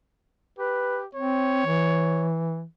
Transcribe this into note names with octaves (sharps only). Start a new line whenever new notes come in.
G4 B4
C4 C#5
E3